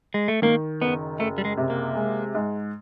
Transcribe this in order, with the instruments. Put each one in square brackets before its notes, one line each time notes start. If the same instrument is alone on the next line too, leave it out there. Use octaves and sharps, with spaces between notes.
[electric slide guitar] G#3
A3
[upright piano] D#3 [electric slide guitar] A#3
[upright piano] F#1 [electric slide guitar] B3
[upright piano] F#1 [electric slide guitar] A3
[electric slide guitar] G3
G#3
[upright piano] C3
[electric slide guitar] A#3
[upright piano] G#3
G#2